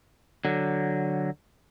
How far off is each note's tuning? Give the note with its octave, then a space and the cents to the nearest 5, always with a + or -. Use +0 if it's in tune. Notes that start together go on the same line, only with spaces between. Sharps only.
D3 +0 F#3 +0